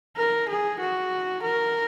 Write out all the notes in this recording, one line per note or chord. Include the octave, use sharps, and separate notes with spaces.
A#4
G#4
F#4
A#4